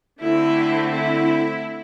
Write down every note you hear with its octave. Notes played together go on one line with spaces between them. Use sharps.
D3 A3 C4 E4
E4